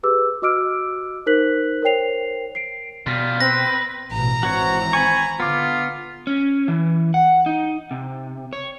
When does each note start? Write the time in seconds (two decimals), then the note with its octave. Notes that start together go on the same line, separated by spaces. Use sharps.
0.03 G4 G#4 B4 D6 E6
0.42 F#4 D#5 D6 E6 F6 D7
1.26 D#4 A#4 C5 F#6 B6 F#7
1.82 A#4 C5 C#5 G5 C7 F7
2.55 C7 D7
3.07 B2 G3 F4
3.40 C4 B4 A#6
4.12 A1 B2 A#5
4.43 G#1 E3 C4 F#4 C#5 F#5
4.93 G#5 B5 C#6
5.40 D3 B3 F4 D6
6.27 C#4
6.68 E3
7.14 F#5
7.46 D#4
7.91 C3
8.53 C#5